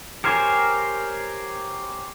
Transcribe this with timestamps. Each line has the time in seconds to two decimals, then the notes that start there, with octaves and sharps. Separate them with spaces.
0.24 G4 A#4 C5 C#5 G#5